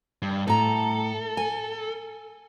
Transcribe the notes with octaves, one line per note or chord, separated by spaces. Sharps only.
G2
A2 A4 A#5
G#5